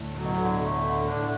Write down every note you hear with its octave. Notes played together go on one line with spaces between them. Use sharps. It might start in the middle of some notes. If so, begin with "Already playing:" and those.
Already playing: D2 A2 D3
A2 F#3
B2
A2 D3
A3
D3
A2 D4